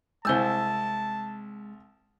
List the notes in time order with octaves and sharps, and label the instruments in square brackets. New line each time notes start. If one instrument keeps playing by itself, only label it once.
[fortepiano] C2 G#5 E6 [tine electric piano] G#3 [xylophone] C5 G6 A6 [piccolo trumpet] A5